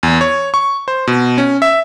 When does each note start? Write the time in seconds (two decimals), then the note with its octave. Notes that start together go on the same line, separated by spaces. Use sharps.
0.03 E2
0.21 C#5
0.54 C#6
0.88 C5
1.07 B2
1.38 C#4
1.62 E5